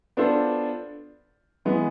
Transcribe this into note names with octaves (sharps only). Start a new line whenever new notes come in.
B3 D4 F4 A4 C5
E3 G#3 B3